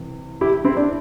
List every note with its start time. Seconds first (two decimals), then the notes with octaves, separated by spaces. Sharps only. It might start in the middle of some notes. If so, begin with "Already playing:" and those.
Already playing: C2 C3 E3
0.41 E4 G4
0.65 C4 E4
0.77 D4